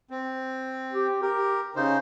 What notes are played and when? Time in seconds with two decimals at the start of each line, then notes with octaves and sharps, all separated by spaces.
0.10 C4
0.92 G4
1.22 G4 A#4
1.76 C#3 C#4 D#4 C5